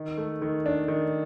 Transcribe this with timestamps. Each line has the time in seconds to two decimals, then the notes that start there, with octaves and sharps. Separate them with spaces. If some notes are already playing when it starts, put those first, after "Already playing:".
Already playing: D#3
0.17 A3
0.42 D#3
0.66 D4
0.88 D#3